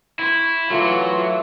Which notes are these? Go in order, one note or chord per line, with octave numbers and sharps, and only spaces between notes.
E4 C6 C#6
E3 F#3 A3 F4